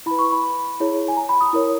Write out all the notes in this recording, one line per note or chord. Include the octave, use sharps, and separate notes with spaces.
E4 B4 B5
C#6
B5
E4 G#4 C#5
G#5
A#5
B5
D#6
E4 A#4 C#5